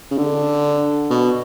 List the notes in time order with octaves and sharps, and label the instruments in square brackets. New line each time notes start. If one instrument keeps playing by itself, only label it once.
[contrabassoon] C#3
D3
B2